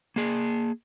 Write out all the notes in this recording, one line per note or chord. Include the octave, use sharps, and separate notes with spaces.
A#3 G#4